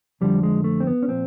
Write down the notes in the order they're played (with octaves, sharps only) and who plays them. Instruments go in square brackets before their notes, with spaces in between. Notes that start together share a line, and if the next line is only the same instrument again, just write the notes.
[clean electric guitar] F2 D3 F3 G3
G#3
A3
C4
B3
C#4
A#2 F3 C4